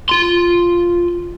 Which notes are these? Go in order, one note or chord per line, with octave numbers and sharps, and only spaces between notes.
F4 C6